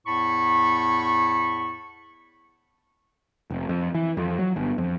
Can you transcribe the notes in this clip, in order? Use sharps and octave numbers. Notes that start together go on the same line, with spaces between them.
E2 A2 A5 B5 C#6
F1
F2
E3
F2
F#3
G1
F2